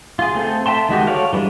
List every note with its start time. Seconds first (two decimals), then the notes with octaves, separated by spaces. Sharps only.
0.19 F4 G#4
0.35 A3 C4 A4
0.66 E5 G5 A5 C6
0.89 D#3 G#3 F#4 G4
1.07 A4 C#5 D5 F5
1.33 E3 G3 G#3 D4